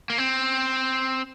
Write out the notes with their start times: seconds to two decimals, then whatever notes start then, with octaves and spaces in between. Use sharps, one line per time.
0.10 A#3
0.18 C4